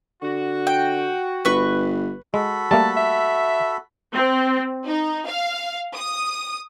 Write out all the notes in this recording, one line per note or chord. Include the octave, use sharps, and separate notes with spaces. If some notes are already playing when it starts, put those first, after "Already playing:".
D3 F#4
G5
G1 B4 C#6
G#3 F#4 A4 B5
G3 A3 A#3 A5
E5
C4
D#4
F5
D#6